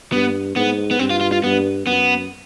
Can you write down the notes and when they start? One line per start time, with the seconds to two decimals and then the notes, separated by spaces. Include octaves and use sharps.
0.12 G2 B3
0.56 G#2 B3
0.91 B3
0.99 G2 C4
1.10 F4
1.21 F4
1.32 F4
1.43 G2 B3
1.87 F#2 B3